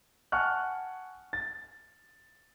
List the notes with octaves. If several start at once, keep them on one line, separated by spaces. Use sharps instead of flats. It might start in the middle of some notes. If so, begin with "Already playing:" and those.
F#5 G#5 A5 C#6 F6 F#6
A6